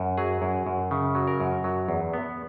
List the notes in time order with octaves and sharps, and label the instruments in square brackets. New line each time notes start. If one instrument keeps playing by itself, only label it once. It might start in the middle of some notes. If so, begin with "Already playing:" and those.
Already playing: [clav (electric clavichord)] F#2
F#3 G#4
F#2
F#2
C#3
F#3
A#4
F#2
F#3
E2
B3